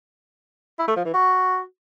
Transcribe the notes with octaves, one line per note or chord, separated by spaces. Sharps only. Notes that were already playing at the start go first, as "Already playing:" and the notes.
E4
A3
F3
E3
F#4